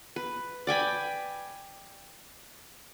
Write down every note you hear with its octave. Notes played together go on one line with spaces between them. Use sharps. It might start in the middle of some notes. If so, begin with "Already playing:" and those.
B4
D5 G5 G#5 B5